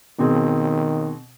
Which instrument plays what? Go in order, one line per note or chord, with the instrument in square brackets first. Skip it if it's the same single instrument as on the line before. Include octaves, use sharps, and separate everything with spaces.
[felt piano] B2 C4 G#4 [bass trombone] D#3